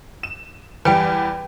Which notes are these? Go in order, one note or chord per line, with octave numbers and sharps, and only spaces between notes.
E7
E2 G3 B4 G5 G#5